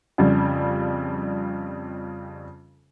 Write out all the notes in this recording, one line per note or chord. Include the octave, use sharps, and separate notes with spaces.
F2 C#3 G3